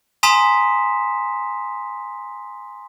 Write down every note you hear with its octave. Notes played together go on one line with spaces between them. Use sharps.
G#5 A#5 C6 D#6 B6 E7